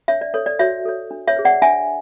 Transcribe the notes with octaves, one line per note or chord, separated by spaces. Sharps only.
D4 C#5 E5
D5
A4 C#5
D5
F#4 C#5 E5
A4 C#5
D4
C#5 E5
G#4 B4
D5 F#5
D4 E5 G#5